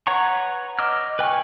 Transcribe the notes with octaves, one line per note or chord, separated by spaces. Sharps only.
B4 C#5 F#5 A#5 C#6
D#5 D6 E6 F6
B4 G5 G#5 C#6